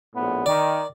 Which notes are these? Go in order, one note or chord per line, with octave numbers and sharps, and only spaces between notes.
A#1 A2 B3
D#3 D5